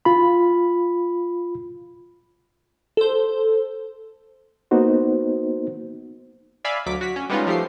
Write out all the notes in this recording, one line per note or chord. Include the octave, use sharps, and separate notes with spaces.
F4 B5
A4 C5
A#3 B3 D#4 F#4 C5
D5 E5 F5 G#5 B5
D2 F#3 D6 B6
F#4 B6
C#4
G3 G#3 B3 C#4 D#4 F4
F3 A3 G4 C7